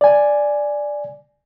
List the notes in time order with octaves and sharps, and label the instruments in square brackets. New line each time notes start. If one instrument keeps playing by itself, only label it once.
[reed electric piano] D5 G#5